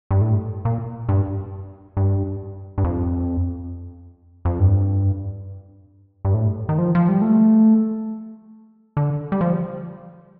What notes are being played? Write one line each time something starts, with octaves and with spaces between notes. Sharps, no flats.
G2
A2
A#2
G2
G2
G2
F2
F2
G2
G2
A2
D#3
F3
F3
G3
A3
D3
G3
F3